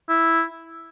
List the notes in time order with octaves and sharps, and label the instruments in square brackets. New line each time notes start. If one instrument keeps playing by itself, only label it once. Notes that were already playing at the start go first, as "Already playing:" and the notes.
[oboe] E4